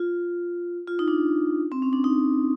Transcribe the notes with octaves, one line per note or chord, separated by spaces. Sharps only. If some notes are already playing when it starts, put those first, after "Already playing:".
Already playing: F4
F4
D#4
D4
C4
C#4
D4
D#4